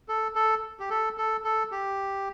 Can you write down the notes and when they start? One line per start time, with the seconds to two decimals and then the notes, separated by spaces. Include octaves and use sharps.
0.09 A4
0.35 A4
0.80 G4
0.90 A4
1.18 A4
1.44 A4
1.72 G4